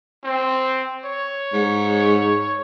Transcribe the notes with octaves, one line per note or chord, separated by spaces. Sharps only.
C4
C#5
G#2